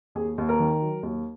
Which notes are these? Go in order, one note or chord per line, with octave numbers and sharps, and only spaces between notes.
D#2 G#4
D#2
A#4
D#3
F#3
D#2